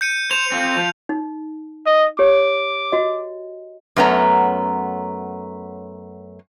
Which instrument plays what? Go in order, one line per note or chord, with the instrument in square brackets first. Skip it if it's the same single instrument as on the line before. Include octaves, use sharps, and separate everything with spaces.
[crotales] G6 C#7 D#7
[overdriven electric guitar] C5 [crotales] F7
[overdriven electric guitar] C4 F4
F3
[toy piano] D#4
[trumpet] D#5
[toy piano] G4 C#5 [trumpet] D6
[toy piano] F#4 D#5
[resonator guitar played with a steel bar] F#2 A3 B3 C#4 A#5